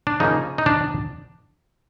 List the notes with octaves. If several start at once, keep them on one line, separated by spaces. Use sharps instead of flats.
D4
C#3 F3 A#3 C#4 D#4
D#4
D4